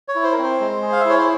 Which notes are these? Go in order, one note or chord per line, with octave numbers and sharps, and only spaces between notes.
C#5
E4
C5
A#4
C4 C5
G#3
G#4
F5
E5
E4 C#5
C5